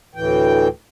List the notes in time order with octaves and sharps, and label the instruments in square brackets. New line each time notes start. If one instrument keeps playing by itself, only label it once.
[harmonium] D2 A2 E3 G5